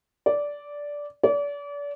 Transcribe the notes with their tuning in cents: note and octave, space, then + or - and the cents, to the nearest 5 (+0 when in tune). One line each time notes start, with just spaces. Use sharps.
D5 -10
D5 -35